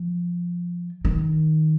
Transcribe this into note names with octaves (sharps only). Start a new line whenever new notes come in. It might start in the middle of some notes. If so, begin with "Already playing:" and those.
Already playing: F3
D#3